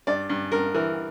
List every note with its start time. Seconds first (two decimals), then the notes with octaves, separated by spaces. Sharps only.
0.07 G2 D5
0.29 G2
0.52 G2 A#4
0.74 E3 A#4